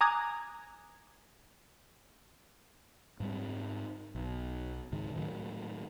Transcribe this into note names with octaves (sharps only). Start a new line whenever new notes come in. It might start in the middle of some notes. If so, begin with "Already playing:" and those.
G#5 A#5 D6 D#6 F#6 G#6
G#2 G3 C4
B1
C#2 G#2 D#3
A2 D#3 F#3